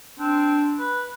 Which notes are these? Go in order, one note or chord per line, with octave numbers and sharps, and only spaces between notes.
C4 D4
B4